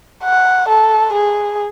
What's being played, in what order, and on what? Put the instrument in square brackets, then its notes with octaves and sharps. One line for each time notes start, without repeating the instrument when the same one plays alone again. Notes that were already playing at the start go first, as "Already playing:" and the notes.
[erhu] F#5
A4
G#4